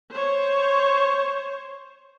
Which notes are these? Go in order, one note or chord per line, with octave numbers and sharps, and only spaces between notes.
C5 C#5